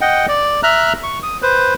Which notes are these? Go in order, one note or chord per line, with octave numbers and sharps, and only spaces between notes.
D#5 F#5 G5
D5
E5 A#5 F6 F#6
C#6
D#6
B4 C5